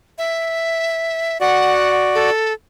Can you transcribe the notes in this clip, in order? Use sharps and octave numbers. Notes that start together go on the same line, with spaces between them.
E5
F#4 D5 F#5
A4